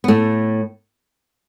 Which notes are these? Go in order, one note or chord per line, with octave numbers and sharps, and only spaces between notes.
B3
A2 A3